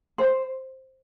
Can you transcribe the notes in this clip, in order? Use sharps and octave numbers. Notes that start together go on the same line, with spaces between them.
C5